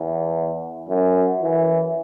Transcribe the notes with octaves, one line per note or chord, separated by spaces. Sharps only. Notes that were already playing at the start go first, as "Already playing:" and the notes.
Already playing: E2
F#2
E3